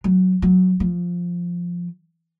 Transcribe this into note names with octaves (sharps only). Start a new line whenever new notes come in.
F#3
F#3
F3